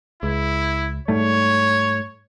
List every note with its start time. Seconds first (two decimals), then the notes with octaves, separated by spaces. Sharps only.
0.23 C#2 E4
1.08 G#2 G3 A3 C#5